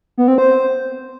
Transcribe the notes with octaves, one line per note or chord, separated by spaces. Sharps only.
B3
C4
C5